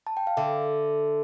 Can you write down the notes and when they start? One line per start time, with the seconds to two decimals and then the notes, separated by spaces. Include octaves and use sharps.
0.07 A5
0.17 G5
0.27 F5
0.37 D3 E5